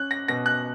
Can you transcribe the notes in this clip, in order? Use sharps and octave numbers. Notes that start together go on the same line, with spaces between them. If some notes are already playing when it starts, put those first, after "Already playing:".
Already playing: C#4 F#6
A#6
B2 A#6
F#6